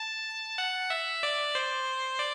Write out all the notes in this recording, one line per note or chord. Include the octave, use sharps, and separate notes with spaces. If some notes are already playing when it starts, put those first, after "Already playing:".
Already playing: A5
F#5
E5
D5
C5
D5